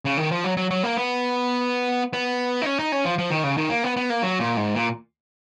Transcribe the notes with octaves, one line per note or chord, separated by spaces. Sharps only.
C#3
D#3
F3
F#3
F#3
F#3
A#3
B3
B3
D#4
C#4
D#4
C#4
F3
F3
D#3
C#3
D#3
A#3
B3
B3
A#3
F#3
A#2
G#2
A#2